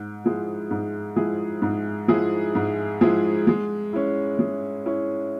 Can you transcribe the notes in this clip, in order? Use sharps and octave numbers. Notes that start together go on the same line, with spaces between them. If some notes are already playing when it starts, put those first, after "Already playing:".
Already playing: G#2
F3 G#3 E4 G#4
G#2
F3 G#3 E4 G#4
G#2
F3 G#3 E4 G#4
G#2
F3 G#3 E4 G#4
G#3
C#4 E4
G#3
C#4 E4